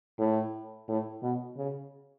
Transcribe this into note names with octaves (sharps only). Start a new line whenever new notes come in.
A2
A2
B2
C#3